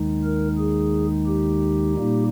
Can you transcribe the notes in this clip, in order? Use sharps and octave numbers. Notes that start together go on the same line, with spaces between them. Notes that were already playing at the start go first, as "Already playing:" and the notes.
Already playing: D#2 D#3 G#3 D#4
A#4
G#4
G4
A#2 G3 A#3 D#4